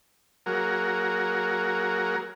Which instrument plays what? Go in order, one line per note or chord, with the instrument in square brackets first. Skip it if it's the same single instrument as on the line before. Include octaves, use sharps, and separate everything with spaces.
[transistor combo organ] F#3 A#3 F#4 G#4 A#4